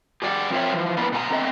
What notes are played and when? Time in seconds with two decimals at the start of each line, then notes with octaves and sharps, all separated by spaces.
0.22 G4 G#4 D5 D#5 F#5
0.50 F3 C4 F4 A#4 C#5 E5
0.73 E3 F3
0.97 A#3 B3 D4 E4 B4
1.12 B2 A3 F#5 G#5 A#5
1.31 B3 C4 A4 D#5 E5